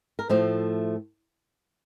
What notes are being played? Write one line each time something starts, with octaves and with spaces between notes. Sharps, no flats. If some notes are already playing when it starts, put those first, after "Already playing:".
A#4
A2 F3 A3 C5